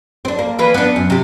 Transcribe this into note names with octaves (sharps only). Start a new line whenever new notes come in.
C4 D4
A#3
E3 A#3 B4
B3 D4
F#2
C3 G4